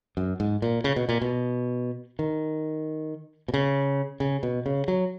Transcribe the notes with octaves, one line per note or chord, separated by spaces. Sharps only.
F#2
G#2
A#2
C#3
B2
A#2
B2
D#3
B2
C#3
C#3
B2
C#3
F#3